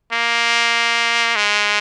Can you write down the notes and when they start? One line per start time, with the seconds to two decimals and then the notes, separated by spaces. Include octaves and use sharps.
0.13 A#3
1.36 G#3